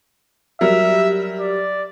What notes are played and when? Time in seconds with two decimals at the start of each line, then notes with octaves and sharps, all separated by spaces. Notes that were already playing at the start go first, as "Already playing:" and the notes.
0.61 F#3 G3 A#4 E5
1.40 D5